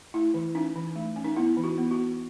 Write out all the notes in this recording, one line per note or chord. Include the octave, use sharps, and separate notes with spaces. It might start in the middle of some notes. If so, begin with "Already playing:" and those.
A3 E4
E3
C#4 D#4
E3
A3
C#4
D#4
B3 E4
E3
F#4
B3
F#4
B3